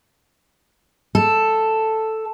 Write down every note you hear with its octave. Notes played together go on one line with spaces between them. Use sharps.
A4